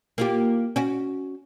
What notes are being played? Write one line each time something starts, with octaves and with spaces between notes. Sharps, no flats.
A#3 F4 G4
C#4 F#4